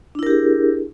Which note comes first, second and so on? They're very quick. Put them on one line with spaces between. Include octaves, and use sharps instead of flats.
D4 E4 A#4 G4 G#4